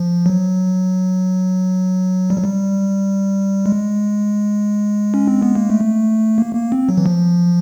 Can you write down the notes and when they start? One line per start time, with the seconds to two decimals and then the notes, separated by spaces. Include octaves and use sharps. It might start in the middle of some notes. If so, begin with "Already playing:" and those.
Already playing: F3
0.26 F#3
2.30 G3
2.37 F#3
2.44 G3
3.66 G#3
5.14 C#4
5.27 C4
5.42 B3
5.55 A#3
5.70 A3
6.38 A#3
6.55 A#3
6.72 C4
6.89 F#3
6.97 E3
7.06 F3